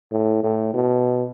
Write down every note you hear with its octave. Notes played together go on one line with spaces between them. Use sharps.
A2
A2
B2